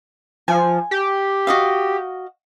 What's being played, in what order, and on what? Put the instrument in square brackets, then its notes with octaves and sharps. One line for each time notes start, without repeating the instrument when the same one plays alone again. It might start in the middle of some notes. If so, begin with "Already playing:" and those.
[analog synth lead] F3 [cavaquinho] G#5
[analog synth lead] G4
[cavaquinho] F#4 D#5 F5